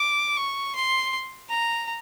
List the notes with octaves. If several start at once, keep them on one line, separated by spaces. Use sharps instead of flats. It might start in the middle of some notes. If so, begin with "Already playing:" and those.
Already playing: D6
C#6
C6
A#5